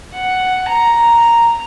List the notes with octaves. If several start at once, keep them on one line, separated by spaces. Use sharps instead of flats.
F#5
A#5